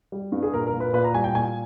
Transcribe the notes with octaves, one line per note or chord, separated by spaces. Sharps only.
G3
G2
G#4
A#2 A#4
A#4
A#2
B4
A#2 B4
A#5
G3 G#5
G5
A#2 G#5